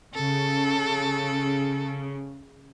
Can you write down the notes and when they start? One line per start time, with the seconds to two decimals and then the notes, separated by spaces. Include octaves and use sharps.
0.14 C#3 A4